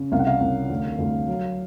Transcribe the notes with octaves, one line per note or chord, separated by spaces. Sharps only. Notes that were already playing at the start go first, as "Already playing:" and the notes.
Already playing: C#3
C2 F5
F#5
F5
C2
D2
D2
F#3